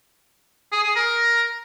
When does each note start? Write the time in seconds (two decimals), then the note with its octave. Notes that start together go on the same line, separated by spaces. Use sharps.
0.72 G#4
0.84 G#4
0.96 A#4